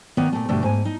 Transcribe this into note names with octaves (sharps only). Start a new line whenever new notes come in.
D#3 B3 D5 A#5
A#2 A3
G2 B2 D3 A3 D5
G#2 G#5
D#4